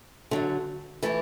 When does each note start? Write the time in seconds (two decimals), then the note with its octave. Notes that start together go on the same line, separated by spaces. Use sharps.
0.31 D3 F#3 A3
1.03 E3 A3 E4 G4